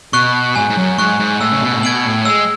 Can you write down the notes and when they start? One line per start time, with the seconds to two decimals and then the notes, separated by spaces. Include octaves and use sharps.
0.13 B2 C#6 F#6
0.55 G#2 G#5
0.70 G#2
0.77 F#2
0.98 G#2 C#6 F#6
1.20 G#2
1.41 A2 E6
1.52 C#3
1.63 B2
1.73 A2
1.83 B2 G#6 D7 F#7
2.05 A2
2.25 G#3 E6